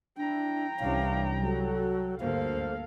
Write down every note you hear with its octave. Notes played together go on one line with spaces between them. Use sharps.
D4 E4 G5 A#5
C2 E3 G3 C#4 D4 F5
F#3 F#4 A4
D2 G2 A#3 A4 C5 F5